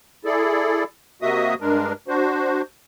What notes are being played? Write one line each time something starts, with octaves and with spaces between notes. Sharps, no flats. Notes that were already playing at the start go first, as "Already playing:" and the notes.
E4 G#4 A4 D5
C3 A#3 F#4 D#5 E5 D#6
G2 G#3 D4 A#4
D4 F#4 C5